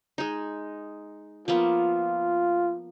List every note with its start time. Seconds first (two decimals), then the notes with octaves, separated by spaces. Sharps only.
0.18 G#3 D#4
1.48 F3 A#3 B3 F4